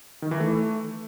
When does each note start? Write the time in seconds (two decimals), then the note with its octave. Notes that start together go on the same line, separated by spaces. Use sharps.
0.22 D#3
0.31 E3
0.40 A3